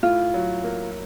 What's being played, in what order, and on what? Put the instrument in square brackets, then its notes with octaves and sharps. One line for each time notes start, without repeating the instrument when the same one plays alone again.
[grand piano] A2 [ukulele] F4
[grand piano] F#3
A#3